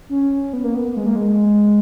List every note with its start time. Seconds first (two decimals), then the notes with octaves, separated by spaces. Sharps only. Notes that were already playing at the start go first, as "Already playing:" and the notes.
0.09 C#4
0.53 B3
0.64 A#3
0.75 B3
0.97 G#3
1.06 A#3
1.16 G#3